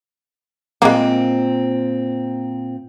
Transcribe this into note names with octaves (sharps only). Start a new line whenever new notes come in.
A#2 G#3 A#3 C4